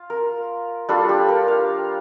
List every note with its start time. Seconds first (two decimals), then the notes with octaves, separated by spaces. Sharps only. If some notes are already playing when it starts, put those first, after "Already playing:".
Already playing: F4
0.10 A#4
0.89 G3 D4 F4 A4
1.09 G4
1.28 A#4
1.48 F5